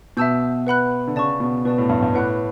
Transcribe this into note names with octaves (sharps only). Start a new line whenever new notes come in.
B2 E5 A5 E6 G6
B4 F#5 B5 F#6
D3
C#3 D5 A5 C#6
B2
B2 B4 D5 A5
A2
G2
G2
A2 B4 F#5 B5 D6 F#6